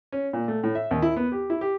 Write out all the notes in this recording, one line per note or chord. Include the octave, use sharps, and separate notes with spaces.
C#4
A#2
A3
A2
E5
D#2
E4
B3
G4
E4
G4